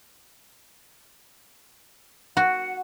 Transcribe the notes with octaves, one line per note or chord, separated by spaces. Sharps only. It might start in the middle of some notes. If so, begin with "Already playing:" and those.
F#4 F#5